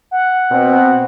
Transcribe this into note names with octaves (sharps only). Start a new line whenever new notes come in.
F#5
B2 C4